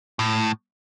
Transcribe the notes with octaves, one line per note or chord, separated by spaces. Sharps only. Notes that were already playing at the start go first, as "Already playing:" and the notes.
A2